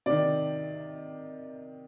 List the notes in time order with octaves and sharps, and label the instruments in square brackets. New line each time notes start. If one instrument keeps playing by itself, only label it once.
[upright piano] C3 D#3 D5